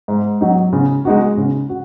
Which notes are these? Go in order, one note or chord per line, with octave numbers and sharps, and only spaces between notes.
G#2
F#3 D#4
C#3
G#3 D#4 F#4
C#3
F#4